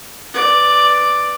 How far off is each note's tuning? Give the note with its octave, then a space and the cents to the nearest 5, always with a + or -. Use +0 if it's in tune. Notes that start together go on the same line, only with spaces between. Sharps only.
B4 +10 D5 +0